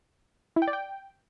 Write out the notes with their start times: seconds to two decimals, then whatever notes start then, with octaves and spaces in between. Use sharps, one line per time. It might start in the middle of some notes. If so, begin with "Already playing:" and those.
0.56 E4
0.62 G5
0.68 D5
0.73 G5